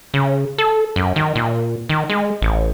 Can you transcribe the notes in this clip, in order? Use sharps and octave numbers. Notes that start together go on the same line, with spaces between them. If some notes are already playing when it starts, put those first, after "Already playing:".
C#3
A4
F#2
D#3
A#2
D#3
G#3
A1